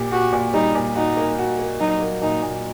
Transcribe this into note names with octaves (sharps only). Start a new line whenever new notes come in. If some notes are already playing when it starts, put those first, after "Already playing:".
Already playing: A#2 G4
F#4 G4
A#2
G3 D#4
A#2
D#4 F#4
A#3
F#4
A#3
F#3 D#4
A#3
A#2 D#4
A#2